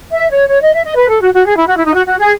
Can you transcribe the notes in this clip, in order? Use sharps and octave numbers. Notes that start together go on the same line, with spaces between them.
E5
C#5
C#5
D#5
E5
D#5
B4
A4
F#4
F#4
G#4
E4
F#4
E4
D#4
F#4
F#4
G#4